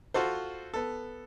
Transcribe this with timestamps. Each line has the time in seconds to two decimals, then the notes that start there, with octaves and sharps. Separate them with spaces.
0.14 F4 F#4 A4 C5
0.74 B3 A4